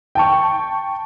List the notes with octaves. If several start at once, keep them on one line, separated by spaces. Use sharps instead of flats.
G5 A5 C#6